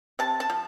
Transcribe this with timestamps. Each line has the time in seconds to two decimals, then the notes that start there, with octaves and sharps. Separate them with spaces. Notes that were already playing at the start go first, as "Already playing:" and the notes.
0.19 C3 A5
0.40 A5
0.50 F3